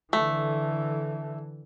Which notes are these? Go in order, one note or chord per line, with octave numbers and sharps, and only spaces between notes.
D3 E3 A3